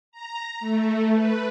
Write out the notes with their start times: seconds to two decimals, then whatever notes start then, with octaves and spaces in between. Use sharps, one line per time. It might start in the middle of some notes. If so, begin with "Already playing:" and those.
0.12 A#5
0.60 A3
1.14 B4